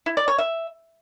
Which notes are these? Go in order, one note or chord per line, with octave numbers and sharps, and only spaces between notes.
E4
D5
C#5
E5